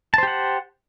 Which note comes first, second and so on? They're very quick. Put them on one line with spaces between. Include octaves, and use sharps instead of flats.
A5 C5 G4 F#5